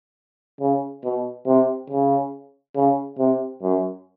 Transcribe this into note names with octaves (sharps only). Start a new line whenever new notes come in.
C#3
B2
C3
C#3
C#3
C3
F#2